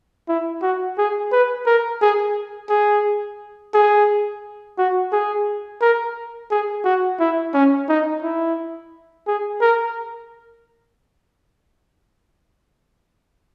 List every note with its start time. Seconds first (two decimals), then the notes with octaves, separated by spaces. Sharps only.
0.29 E4
0.62 F#4
0.98 G#4
1.32 B4
1.66 A#4
2.01 G#4
2.70 G#4
3.74 G#4
4.78 F#4
5.12 G#4
5.81 A#4
6.51 G#4
6.84 F#4
7.20 E4
7.54 C#4
7.89 D#4
8.23 E4
9.27 G#4
9.61 A#4